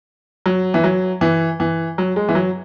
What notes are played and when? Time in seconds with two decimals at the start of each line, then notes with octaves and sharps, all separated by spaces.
0.46 F#3
0.74 E3
0.84 F#3
1.21 E3
1.60 E3
1.98 F#3
2.16 G#3
2.29 E3
2.35 F#3